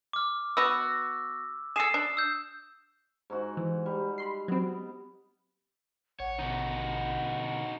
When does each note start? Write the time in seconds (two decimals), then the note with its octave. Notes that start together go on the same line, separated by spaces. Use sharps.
0.13 D6 F6
0.57 B3 F#4 E6
1.76 G#4 A4 D#6 C7 E7
1.94 D4
2.17 E6 G6
3.30 G#2 D#4 F#4
3.57 E3
3.86 G3
4.18 B5 C6 C7
4.48 F#3 B3 C4
6.20 A1 C#5 F#5
6.39 B2 D3 D#4 F#4